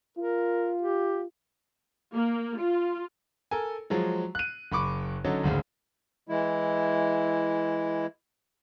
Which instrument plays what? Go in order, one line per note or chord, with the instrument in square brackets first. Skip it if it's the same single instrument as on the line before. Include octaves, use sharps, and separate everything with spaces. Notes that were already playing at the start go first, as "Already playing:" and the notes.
[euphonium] F4 [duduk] A#4
[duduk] G4
[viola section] A#3
F4
[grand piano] A4 A#4 G#5
F3 F#3 G#3
F#6 D#7
F#1 B5 C#6 D6
D3 F#3 C#4 D#4 A4
G#1 D2 C#3
[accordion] E3 G#3 E4